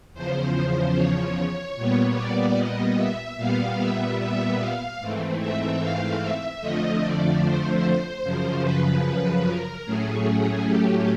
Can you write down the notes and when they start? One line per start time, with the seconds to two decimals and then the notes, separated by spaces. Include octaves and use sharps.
0.14 E2 C#3 F3 C5
0.95 C#5
1.76 A#2 G3 B3
2.16 D5
2.56 D#5
2.97 E5
3.37 A#2 G3 B3 F5
3.78 E5
4.19 E5
4.60 F5
5.00 G#2 E3 A3 C4
5.40 E5
5.80 F5
6.21 E5
6.61 F2 D3 F3 A3 D#5
7.02 D5
7.43 C5
8.23 F#2 C#3 F3
8.64 B4
9.45 A#4
9.85 A2 F#3 A3 C#4 G#4
10.66 G4